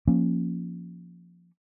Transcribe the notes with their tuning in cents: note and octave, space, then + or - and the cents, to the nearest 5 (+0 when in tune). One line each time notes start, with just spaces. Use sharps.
F3 +0 A#3 +0 C#4 -15